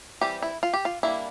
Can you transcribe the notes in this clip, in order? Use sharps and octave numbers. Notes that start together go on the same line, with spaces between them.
E3 G3 C4 G4
E4
F4
G4
F4
G3 A#3 D4 E4